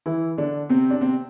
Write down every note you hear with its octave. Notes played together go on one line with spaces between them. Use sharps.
E3 E4
D3 D4
C3 C4
D4
C3 C4